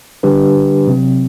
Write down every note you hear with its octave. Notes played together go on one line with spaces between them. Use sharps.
D3 G3 D4 G4 B4
C3 F#3 C4